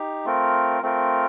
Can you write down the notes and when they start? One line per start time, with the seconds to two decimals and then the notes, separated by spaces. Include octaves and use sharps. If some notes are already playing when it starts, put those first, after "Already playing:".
Already playing: D#4 G4
0.25 A3 C4 F4 A#4
0.83 A3 C4 F4 A#4